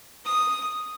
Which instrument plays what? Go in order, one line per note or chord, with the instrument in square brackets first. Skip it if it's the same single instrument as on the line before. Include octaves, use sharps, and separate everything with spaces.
[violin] D#6